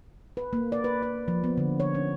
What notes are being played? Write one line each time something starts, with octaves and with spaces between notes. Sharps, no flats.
B4
A#3
D5
B4
D5
F3
B3
D3
C#5
C#4